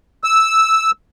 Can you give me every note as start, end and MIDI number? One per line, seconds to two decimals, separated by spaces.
0.24 0.91 88